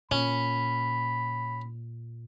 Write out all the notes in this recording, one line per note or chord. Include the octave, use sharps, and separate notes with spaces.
A#2 C#4 B5